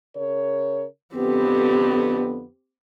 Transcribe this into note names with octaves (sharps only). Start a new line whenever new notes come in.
C#3 A#4 C#5
F2 D3 B3 C4 G4